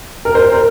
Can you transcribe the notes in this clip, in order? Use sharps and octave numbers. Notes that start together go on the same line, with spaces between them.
A#4
C5
A#4